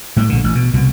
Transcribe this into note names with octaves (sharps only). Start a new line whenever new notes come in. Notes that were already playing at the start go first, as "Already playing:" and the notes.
A2 F#3 G3
A#1 D3
A1
B2
C2 B2